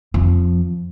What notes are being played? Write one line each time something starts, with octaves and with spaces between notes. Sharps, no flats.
F2 F3